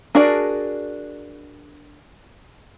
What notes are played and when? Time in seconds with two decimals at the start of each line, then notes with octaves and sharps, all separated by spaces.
0.15 D4 F#4 G#4 A#4 D5